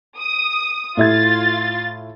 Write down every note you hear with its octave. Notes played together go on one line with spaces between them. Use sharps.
D#6
A2 F4 E5 G#6 A6